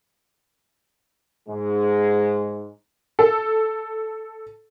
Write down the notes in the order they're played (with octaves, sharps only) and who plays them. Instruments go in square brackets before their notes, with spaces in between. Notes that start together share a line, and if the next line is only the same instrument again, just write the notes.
[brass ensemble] G#2 G#3
[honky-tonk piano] A4